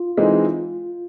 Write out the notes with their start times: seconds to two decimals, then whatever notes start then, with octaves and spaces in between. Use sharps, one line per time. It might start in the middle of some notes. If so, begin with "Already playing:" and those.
Already playing: F4
0.17 E3 G#3 C4 D#4